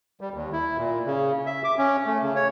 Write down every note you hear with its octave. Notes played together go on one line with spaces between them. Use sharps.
G3
D#2
E4
A#2
C#3
E5
D6
C#4
A3
C#3
C#5